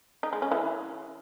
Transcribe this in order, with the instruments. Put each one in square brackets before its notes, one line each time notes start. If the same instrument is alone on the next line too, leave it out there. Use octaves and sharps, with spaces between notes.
[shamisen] D#4
G#3
C#4
E3